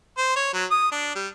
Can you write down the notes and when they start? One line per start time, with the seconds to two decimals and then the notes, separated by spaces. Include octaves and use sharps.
0.17 C5
0.36 C#5
0.53 F#3
0.71 D#6
0.92 D4
1.15 G3